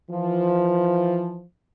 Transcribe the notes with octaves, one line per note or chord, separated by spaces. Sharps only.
E3 F3